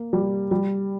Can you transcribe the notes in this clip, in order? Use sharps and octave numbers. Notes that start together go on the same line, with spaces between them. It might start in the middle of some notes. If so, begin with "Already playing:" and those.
Already playing: A#3
G3
G3